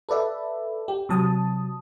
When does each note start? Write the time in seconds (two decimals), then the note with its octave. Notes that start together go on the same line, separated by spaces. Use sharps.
0.09 A4 B4 D5 E5
0.88 G4
1.09 C3 F#3 A5 D#6